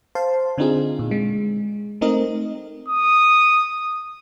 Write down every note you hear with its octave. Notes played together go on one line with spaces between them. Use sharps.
C5 F5 A5 C6
D3 C4 D4 D#4 F4 G#4
A#2
G#3
A3 C4 D#4 A#4 D#5
D#6